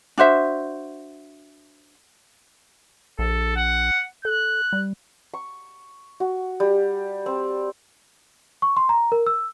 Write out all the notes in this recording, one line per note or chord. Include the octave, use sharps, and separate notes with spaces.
D4 F#4 C5 E5
A#1 A4
F#5
A4 F#6
G3
C#6
F#4
G3
C4
C#6
C6
A#5
A#4
E6